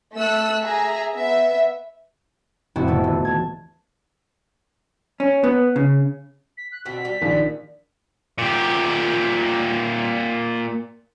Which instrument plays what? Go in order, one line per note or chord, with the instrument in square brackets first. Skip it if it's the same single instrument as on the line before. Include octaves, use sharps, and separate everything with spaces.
[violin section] A3 A4 E6 F#6
G#4 E5 A#5
B3 E5
[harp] F1 A2 C3 E4 F#4 E5
D3 E3 A3 B3
D#1
A5 G#6
[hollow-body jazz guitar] C#4
B3
C#3
[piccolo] B6
F#6
[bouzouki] B2 D3 C4 [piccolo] B6
[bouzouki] G3
[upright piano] A#1 D#3
[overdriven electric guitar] A#2 G4